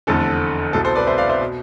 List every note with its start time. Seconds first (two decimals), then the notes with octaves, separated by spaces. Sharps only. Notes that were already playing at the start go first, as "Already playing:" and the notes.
0.07 F1 E2 D3 A4
0.73 C2 B2 A4
0.85 A4 C5
0.95 B4 D5
1.07 C5 E5
1.18 D5 F5
1.29 C5 E5
1.41 B2